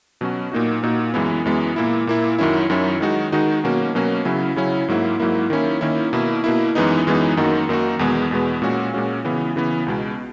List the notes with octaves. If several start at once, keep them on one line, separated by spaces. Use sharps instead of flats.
B2 F#3 C#4 F#4
A#2 A#3 D#4 F#4
A#2 A#3 D#4 F#4
F#2 E3 G#3 B3
F#2 E3 G#3 B3
A#2 A#3 E4
A#2 A#3 E4
F#2 D#3 F#3 C#4 E4
F#2 D#3 F#3 C#4 E4
D#3 G#3 D#4 F#4
D#3 G#3 D#4 F#4
B2 F#3 A#3 C#4 F#4
B2 F#3 A#3 C#4 F#4
C#3 F#3 C#4 E4
C#3 F#3 C#4 E4
G#2 F#3 A#3 E4
G#2 F#3 A#3 E4
D#3 A#3 C#4 E4
D#3 A#3 C#4 E4
B2 A#3 E4
B2 A#3 E4
F#2 E3 G#3 B3 D#4
F#2 E3 G#3 B3 D#4
F#2 D#3 A#3 D#4 F#4
F#2 D#3 A#3 D#4 F#4
E2 B2 G#3 B3
E2 B2 G#3 B3
A#2 G#3 C#4 F#4
A#2 G#3 C#4 F#4
C#3 E3 B3
C#3 E3 B3
C#2 B2 G#3